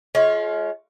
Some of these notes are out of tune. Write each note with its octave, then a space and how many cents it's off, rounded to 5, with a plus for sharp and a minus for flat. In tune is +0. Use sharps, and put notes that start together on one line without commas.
G#3 +40 F4 +0 C#5 +0